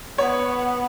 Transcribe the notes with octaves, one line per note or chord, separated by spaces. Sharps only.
B3 C#5